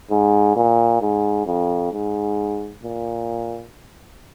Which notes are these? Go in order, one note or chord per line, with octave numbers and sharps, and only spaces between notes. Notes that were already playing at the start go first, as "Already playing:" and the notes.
G#2
A#2
G#2
F2
G#2
A#2